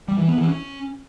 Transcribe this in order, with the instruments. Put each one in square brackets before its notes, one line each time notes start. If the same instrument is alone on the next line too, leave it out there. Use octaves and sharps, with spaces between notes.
[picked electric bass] G3
E3
B3
E3
C#4